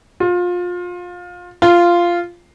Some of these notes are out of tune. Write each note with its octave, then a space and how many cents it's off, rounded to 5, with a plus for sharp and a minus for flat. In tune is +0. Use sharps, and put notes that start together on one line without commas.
F4 +25
F4 -10